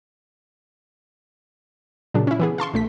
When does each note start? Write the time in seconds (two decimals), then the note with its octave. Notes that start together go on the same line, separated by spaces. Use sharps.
2.14 A#2 C#3 F#3 D4
2.27 C#4 E4
2.40 E3 B3 G#4
2.58 F5 A5 C6 C#6
2.74 A#1 A3 B6